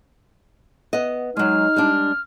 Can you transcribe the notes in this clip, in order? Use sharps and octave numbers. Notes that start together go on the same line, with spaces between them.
B3 D#5
F#3 G#3 D#4 F6
G3 G#3 D4